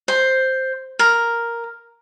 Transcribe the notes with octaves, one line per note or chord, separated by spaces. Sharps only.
C5
A#4